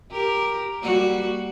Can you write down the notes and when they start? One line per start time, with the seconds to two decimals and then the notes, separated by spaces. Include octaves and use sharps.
0.12 G4 A#4
0.82 G3 A#3 F#4